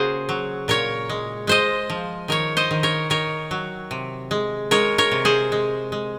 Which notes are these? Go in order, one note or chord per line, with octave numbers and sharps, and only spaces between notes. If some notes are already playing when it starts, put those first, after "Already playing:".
Already playing: C#3 A#3 F#4 G#4 A#4 C5
F#3
A#2 A#4 C#5
G#3
G#3 C5 D#5
F3
D#3 A#4 C#5
C5 D#5
D#3
A#4 C#5
D#3 A#4 C#5
F#3
C3
G#3
G#3 A#4 C#5
A#4 C#5
C3
G#4 C5
G#3
G#3